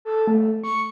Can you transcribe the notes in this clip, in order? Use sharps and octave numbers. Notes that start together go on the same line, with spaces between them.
A4
A3
C#6